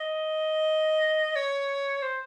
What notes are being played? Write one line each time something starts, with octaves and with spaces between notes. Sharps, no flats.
D#5
C#5
C5